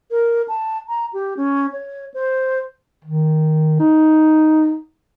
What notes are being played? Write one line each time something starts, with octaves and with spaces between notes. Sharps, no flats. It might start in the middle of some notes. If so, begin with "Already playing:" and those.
A#4
A5
A#5
G4
C#4
C#5
C5
D#3
D#4